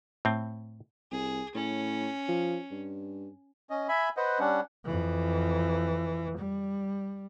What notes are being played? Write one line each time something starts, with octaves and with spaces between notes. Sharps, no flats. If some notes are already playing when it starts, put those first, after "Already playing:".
A2 C4
C2 G#4
A2 C#4
F3
G2
C#4 D#5
E5 G#5 B5
B4 C5 D#5 F#5
G3 C#4 D4 F#5
F2 E3
G3